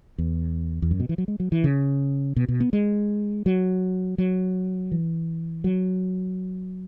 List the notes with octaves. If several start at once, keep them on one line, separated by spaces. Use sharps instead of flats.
E2
E2
F#2
B2
E3
F#3
G#3
F#3
E3
C#3
B2
B2
B3
G#3
F#3
F#3
E3
F#3